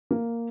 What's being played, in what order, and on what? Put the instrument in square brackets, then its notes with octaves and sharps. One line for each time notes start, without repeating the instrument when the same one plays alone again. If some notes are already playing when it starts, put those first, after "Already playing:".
[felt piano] A#3